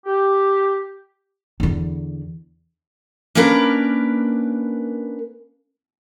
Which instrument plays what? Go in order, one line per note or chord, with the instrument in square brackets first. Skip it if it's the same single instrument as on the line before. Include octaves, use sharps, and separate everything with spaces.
[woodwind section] G4
[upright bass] E2 D3
[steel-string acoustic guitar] A#3 C#4 D4 A#4 B4